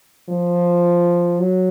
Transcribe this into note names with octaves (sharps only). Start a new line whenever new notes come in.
F3
F#3